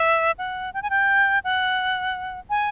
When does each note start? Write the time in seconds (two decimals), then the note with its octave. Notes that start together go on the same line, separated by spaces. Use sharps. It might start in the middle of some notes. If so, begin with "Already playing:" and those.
Already playing: E5
0.39 F#5
0.74 G5
0.83 G#5
0.90 G5
1.44 F#5
2.50 G#5